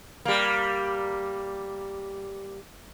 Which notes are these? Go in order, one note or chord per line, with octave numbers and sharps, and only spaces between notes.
G3 A#3